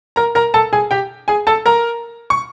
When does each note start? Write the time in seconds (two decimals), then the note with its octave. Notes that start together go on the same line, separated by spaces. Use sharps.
0.16 A#4 A#5
0.35 A#4 A#5
0.54 A4 A5
0.73 G#4 G#5
0.91 G4 G5
1.28 G#4 G#5
1.47 A4 A5
1.66 A#4 A#5
2.30 C#6